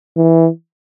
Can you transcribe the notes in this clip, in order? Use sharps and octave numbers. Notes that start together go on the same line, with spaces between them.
E3